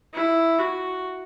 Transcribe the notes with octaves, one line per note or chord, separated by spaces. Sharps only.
E4
F#4